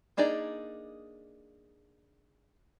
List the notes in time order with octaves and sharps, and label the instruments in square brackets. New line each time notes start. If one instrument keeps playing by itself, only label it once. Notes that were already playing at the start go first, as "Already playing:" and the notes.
[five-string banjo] A#3 D4 D#4 G#4 D5